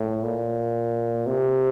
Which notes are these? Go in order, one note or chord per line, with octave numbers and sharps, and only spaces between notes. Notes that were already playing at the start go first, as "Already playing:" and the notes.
Already playing: A2
A#2
C3